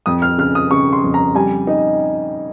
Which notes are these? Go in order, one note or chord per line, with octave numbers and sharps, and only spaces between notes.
F2 D#6
F6
C#3 F6
D#6
C#3 C#6
C6
F2
A#5
G3 G#5
D#4